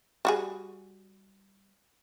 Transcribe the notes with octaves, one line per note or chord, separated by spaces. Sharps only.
G3 F#4 G#4